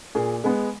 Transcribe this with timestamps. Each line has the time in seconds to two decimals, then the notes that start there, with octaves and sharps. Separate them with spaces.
0.15 A#2 G#4
0.44 G#3 B3